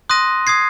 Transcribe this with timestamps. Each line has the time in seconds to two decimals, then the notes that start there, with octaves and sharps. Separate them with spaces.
0.10 C6 D#6 F#6 A#6 D#7
0.47 D#6 G#6 C7